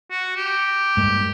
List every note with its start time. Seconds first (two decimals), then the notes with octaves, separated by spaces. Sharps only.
0.11 F#4
0.36 G4
0.97 G2 G#3 A#3